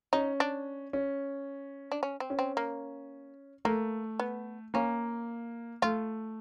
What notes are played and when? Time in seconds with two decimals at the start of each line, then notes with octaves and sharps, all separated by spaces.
0.13 C#4 D#4
0.40 D4
0.93 C#4
1.92 D4
2.03 C#4
2.20 C4
2.30 C#4
2.39 C4
2.57 A#3
3.65 A3 A#3
4.19 B3
4.74 A#3 C#4
5.82 A3 F4